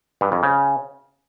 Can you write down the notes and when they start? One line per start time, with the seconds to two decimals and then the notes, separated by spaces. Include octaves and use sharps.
0.21 G2
0.32 F2
0.43 C#3